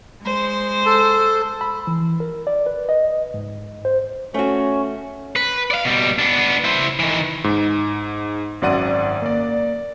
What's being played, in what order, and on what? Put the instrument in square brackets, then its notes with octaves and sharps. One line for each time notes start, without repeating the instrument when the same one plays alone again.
[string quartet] G#3 C5
[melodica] A4
[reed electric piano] B5
E3
A#4
D5
B4
D#5
G#2
C5
[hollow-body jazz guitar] A3 F#4 [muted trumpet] C#4
[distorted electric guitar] B4
D5 F5
B2 G3
B3 D4
E4 C5
D#3 E3
[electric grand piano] G#2
G#1 F#2 D5 F#5 D#7
A#3 D5